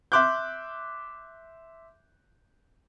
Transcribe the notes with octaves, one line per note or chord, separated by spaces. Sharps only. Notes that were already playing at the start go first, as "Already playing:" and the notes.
E5 C6 D6 F#6 G6